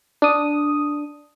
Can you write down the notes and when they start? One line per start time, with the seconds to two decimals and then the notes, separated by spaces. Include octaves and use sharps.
0.22 D4 D#6